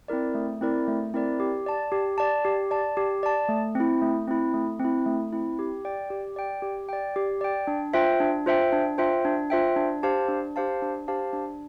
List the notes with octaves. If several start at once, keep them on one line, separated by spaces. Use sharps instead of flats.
C4 E4 A#4 D5
A3
C4 E4 A#4 D5
A3
C4 E4 A#4 D5
G4
D5 A5
G4
D5 A5
G4
D5 A5
G4
D5 A5
A3
C4 E4
A3
C4 E4
A3
C4
E4
A3
C4 E4
G4
D5 G5
G4
D5 G5
G4
D5 G5
G4
D5 G5
D4
F4 C5 E5 G5
D4
F4 C5 E5 G5
D4
F4 C5 E5 G5
D4
F4 C5 E5 G5
D4
G4 C5 F5 A5
D4
G4 C5 F5 A5
D4
G4 C5 F5 A5
D4